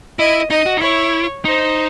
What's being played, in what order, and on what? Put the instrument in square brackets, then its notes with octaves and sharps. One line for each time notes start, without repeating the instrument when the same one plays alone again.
[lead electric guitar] E4 [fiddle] D#5
[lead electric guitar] D#4 [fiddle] D#5
[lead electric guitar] F#4
D#4
[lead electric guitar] E4 [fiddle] C#5
[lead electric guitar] D#4 [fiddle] C5